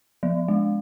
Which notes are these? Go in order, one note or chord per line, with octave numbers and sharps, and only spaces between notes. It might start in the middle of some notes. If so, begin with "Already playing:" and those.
F3
G#3